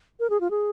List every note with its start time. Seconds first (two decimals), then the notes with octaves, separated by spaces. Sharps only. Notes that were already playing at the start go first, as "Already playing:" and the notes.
0.20 A#4
0.30 G#4
0.41 F4
0.51 G#4